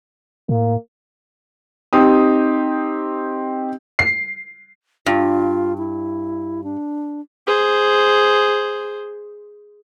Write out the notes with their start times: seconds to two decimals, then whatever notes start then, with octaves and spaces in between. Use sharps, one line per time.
0.49 A2 A#3
1.93 C4 D#4 G4 D#6
3.99 C7
5.06 G2 F4
5.78 E4
6.64 D4
7.47 G#4 C5